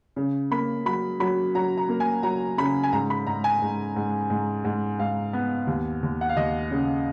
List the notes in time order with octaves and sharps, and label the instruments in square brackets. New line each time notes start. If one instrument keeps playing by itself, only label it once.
[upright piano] C#3
A#3 B5
F#3 B5
F#3 B5
F#3 A#5
A#5
A#3
G#5
F#3 A#5
C#3 B5
G#5
G#2 A#5
B5
G#2 A#5
G#5
G#2
G#2
G#2
G#2
G#2 F5
B3
D#2
D#2
F#5
F5
D#2 D#5
C#3